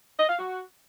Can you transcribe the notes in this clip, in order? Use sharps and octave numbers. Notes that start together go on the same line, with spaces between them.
D#5
F5
F#4